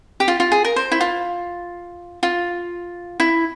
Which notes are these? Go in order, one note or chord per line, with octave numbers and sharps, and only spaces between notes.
G4
F4
F4
G#4
A#4
C5
E4
F4
F4
E4